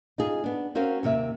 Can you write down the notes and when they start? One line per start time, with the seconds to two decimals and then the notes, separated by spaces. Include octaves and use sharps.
0.18 D#4 F4 G#4
0.44 B3 D4
0.75 C4 C#4 F#4 A#4 C5 F5
1.03 D#2 C3 A#3 E5